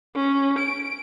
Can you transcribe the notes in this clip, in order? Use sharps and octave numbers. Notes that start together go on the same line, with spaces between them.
C#4
D7